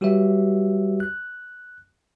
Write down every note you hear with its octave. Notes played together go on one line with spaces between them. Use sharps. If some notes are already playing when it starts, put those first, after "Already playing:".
G3 F#4 G4 B4 C#5 E5
F#6